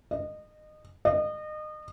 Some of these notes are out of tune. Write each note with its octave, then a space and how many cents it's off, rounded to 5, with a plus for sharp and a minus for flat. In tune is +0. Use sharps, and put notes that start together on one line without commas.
D#5 -25
D#5 -30